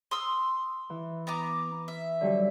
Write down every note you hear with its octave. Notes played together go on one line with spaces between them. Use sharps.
C6 D#6 E6
E3
B3 A#5 D6
E5
D3 F#3 G3